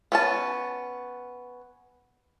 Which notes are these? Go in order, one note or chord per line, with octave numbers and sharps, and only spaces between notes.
B3 C#4 A5